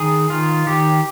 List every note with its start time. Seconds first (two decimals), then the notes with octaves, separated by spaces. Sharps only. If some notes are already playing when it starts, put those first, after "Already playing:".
Already playing: D#3 G#4
0.30 D#3 F4
0.66 D#3 G4